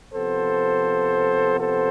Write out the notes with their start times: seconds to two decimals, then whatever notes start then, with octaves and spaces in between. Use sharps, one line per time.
0.14 C3 F3 B3 A4 C5
1.60 A4 C5